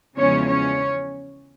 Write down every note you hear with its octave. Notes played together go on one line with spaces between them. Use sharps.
E2 C#3 F3 G#3 C#4 C#5
C#4 C#5